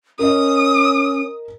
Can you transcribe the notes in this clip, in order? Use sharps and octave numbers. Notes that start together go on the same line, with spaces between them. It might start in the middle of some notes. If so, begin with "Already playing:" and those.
C#4 A#4 D#5 D#6